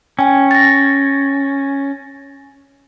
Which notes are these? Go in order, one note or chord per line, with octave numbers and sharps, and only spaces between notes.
C#4 G5 G#5
A6 A#6